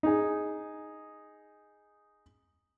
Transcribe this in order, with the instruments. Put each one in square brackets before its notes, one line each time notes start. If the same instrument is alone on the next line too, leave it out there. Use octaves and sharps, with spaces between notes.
[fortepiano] D#4 G#4